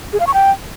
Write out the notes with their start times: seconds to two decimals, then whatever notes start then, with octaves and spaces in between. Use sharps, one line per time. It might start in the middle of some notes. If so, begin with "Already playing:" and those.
0.13 G#4
0.20 F5
0.27 C#6
0.34 G5